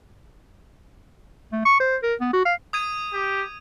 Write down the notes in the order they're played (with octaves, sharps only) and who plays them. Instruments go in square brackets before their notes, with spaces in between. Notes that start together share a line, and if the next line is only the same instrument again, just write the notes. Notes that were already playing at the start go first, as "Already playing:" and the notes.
[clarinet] A3
C#6
C5
A#4
B3
F#4
F5
[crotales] D#6 G#6 D#7
[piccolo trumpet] G4